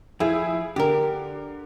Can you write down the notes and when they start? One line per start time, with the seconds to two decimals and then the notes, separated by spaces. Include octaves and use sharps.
0.20 F3 E4 G#4
0.76 D3 G4 A#4